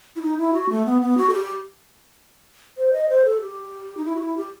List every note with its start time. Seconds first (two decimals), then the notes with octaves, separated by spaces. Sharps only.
0.16 E4
0.22 D#4
0.38 E4
0.53 F#4
0.69 A3
0.86 B3
1.02 B3
1.17 F#4
1.29 A4
1.33 G4
2.77 C5
2.93 D#5
3.09 C5
3.25 A4
3.41 G4
3.97 D#4
4.05 E4
4.16 F#4
4.21 E4
4.37 G4